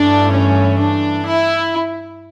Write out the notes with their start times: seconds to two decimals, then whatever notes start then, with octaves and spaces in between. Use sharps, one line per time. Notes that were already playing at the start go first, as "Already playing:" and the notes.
Already playing: G2 E3 A3 D4
0.31 C#4
0.79 D4
1.26 E4